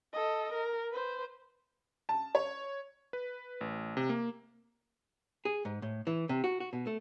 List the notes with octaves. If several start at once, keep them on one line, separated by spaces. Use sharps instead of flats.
A4 D#5
A#4
B4 C5
A5
C#5
B4
A1
C3
A#3
G#4
G#2
A2
E3
C3
F#4
F#4
B2
A3